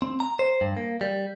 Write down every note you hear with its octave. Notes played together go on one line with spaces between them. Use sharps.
C4
A#5
C5
G2
A#3
G3